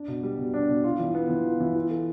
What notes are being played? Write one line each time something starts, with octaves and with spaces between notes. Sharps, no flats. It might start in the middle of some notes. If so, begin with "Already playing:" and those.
Already playing: D4
B2
G3
B2
D4
B2
F4
E3
B3
E3
F4
E3
F4
A4